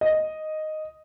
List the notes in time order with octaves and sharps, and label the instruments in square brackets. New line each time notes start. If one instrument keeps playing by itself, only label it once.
[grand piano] D#5